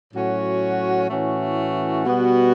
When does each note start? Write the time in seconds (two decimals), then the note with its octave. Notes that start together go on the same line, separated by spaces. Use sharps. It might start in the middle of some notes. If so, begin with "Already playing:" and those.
0.13 A2 F#3 C#4 F#4
1.09 A2 E3 A3 C#4 F#4
2.05 B2 G3 B3 F#4